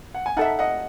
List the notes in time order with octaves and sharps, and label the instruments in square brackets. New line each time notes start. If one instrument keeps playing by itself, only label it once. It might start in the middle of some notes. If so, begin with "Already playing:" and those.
[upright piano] F#5
G#5
[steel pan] D#4 A4 E5 [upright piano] F#5 A5
[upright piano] D#5 F#5